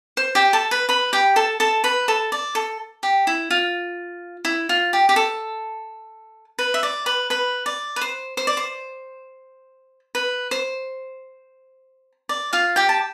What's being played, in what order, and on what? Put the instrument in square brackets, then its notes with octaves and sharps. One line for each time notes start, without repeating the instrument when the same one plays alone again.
[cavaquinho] C5
G4 G5
A4 A5
B4 B5
B4 B5
G4 G5
A4 A5
A4 A5
B4 B5
A4 A5
D5
A4
G4
E4
F4
E4
F4
G4
G4
A4
B4
E5
D5
B4 B5
B4 B5
D5
B4
C5
C5
D5
C5
B4
C5
D5
F4 F5
G4 G5
A5